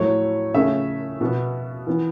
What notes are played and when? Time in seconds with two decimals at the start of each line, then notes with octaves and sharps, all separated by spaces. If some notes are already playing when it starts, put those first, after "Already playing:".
Already playing: A2 F#3 A3 C#5
0.54 C#3 A3 C#4 E5
1.21 B2 B3
1.87 E3 B3